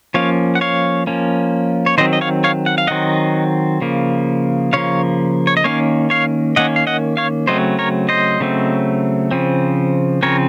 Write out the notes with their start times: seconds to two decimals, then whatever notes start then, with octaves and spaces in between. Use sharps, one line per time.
0.14 F3 A#3 C#4 C#5 F5
0.55 F#5
0.61 C#5 F5
1.07 F3 A#3 C#4
1.86 C#5
1.98 D#3 F#3 C4 C5 D#5
2.13 D#5
2.21 C#5 F5
2.44 C#5 F5
2.66 F#5
2.78 F5
2.87 D#3 F#3 C4 D#5 F#5
3.81 C#3 F3 A#3
4.73 C#3 F3 A#3 C#5 F5
5.47 C#5
5.57 D#5
5.64 D#3 A#3 C#4 C#5 F5
6.10 C#5 F5
6.56 D#3 A#3 C#4 D#5 F#5
6.76 F5
6.87 D#5 F#5
7.17 C#5 F5
7.47 C#3 F#3 A3 C4 C5 D#5
7.79 A#4 C#5
8.09 C5 D#5
8.40 C#3 F#3 A3 C4
9.31 C#3 F3 C4
10.22 C#3 F3 C4 A#4 C#5